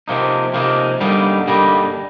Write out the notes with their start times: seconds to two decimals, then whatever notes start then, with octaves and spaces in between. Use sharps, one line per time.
0.08 C3 F3 A#3 D#4
0.54 C3 F3 A#3 D#4
1.00 G2 D3 G3 A#3 D#4
1.47 G2 D3 G3 A#3 D#4